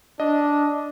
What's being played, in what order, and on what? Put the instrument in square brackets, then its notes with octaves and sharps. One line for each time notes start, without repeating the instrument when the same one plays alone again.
[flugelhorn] D4 [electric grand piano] D#5